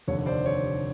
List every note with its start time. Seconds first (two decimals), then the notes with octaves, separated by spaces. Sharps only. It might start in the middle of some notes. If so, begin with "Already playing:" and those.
0.08 F1 D#2 D3 C#5
0.26 C5 D5
0.46 C#5